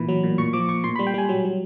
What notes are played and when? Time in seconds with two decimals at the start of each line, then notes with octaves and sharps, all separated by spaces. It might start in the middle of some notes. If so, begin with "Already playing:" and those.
Already playing: A#2 E3 B5
0.08 F#3
0.23 A#2
0.38 A#2 C#6
0.53 F3 D6
0.69 A#2 C#6
0.84 A#2 C6
0.96 G3 B5
1.07 G5
1.14 G3 G#5
1.29 F#3
1.45 F#3